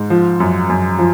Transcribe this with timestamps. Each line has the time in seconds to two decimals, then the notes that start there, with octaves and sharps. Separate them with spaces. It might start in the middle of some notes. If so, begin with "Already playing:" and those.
Already playing: G#2
0.10 F3
0.40 F#2
0.69 F#2
0.98 F3